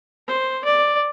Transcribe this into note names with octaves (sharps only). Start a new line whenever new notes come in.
C5
D5